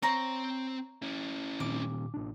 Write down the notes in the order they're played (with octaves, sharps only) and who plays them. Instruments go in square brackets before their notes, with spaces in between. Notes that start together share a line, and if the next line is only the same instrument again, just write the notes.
[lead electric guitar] C4 C5 [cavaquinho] C#5 A#5
[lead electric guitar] C#4 E4
[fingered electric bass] A#2 D#3 C4 [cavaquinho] D6
[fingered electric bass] A1 D4